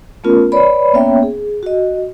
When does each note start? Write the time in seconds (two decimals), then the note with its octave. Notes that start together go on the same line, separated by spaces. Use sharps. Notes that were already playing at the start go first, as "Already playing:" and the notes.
0.24 A3 B3 C#4 F4 A#4
0.52 B4 C#5 D5 B5
0.93 A#3 B3 C#4 C#5 E5 G5
1.23 G#4
1.63 F#4 D#5